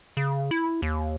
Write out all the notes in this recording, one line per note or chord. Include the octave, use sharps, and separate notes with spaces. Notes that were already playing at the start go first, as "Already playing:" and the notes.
C#3
E4
D#2